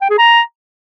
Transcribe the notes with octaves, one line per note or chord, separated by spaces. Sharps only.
G5
G#4
A#5